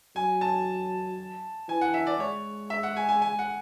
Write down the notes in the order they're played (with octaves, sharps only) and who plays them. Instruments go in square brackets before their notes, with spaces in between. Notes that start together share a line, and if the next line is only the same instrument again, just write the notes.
[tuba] F#3 [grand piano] G#5
[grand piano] A5
[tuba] E3 [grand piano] G#5
[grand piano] F#5
E5
D5
[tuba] G#3 [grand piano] C#5
[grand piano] E5
F#5
G#5
G#5
G#5
F#5